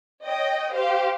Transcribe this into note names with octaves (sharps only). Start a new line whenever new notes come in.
C#5 D#5 G5
G4 C5 F5